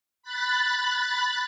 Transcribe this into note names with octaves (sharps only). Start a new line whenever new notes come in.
B5 F#6 A6